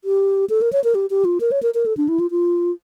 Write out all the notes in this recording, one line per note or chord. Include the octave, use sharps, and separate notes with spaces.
G4
A4
A#4
C#5
A#4
G4
G4
F4
A#4
C#5
A#4
A#4
A4
D4
E4
F4
F4